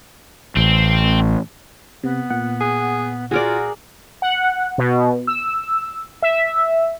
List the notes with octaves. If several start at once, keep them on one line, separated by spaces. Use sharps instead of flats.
A1 C4
C3 B3
A#2 F#5
G#4
F4 F#4 G#4 A#4 D5
F#5
B2
E6
E5